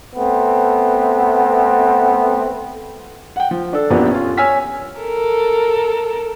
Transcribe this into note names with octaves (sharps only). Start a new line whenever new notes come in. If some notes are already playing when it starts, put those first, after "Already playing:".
A3 B3 C4
F#5 G5
F3
D4 A4
A#1 F#2 F3 B3 D4 G4
C#4 F4
C#5 G#5 E6 F6 B6
A4 A#4